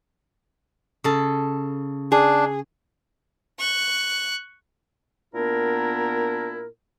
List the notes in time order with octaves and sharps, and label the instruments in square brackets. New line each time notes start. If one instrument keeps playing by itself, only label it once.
[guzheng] C#3 A4
[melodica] D4 [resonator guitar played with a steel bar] G#4
[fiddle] C#6 F#6
[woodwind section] A#2 B3 D4 E4 A#4